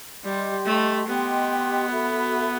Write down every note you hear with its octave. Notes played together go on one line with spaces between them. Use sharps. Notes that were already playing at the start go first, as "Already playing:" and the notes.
G3 G4 D#5 G5 C6
A3
B3 G4 D#5 G5 C6
F#4 A4 E5 B5